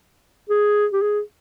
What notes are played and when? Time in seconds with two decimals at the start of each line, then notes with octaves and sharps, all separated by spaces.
0.50 G#4
0.93 G4
1.02 G#4